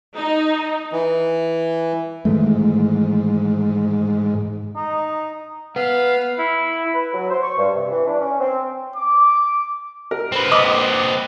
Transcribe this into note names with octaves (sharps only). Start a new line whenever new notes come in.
D#4
E3
G#2 D#3 E3 A3
D#4
B3 F5
E4
B4
F#3
C5
C#6
G2
C3
E3
D4
C#4
C4
D6
A#4
C4 B4
D#5 D6